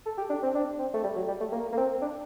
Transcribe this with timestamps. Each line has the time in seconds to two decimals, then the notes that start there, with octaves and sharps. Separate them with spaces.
0.06 A4
0.18 G4
0.30 D4
0.42 C4
0.55 D4
0.79 C4
0.93 A3
1.04 G3
1.16 F#3
1.27 G3
1.40 A3
1.52 A#3
1.72 A#3
1.77 C4
2.01 D4